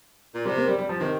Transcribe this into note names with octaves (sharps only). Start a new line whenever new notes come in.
A#2
C3 G3
A#3
G3
G3
F3
C3 D#3